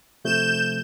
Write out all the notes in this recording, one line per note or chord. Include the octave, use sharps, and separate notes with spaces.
C3 F3 A3 G6 E7